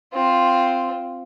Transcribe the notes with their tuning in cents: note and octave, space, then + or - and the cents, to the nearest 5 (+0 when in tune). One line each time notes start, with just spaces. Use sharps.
C4 +0 F4 +0